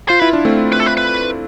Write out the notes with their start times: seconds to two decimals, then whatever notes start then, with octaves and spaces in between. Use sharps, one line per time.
0.09 F4 C5
0.20 E4 B4
0.33 D4
0.45 A3 C4
0.72 B4
0.80 A4
0.86 B4
0.97 B4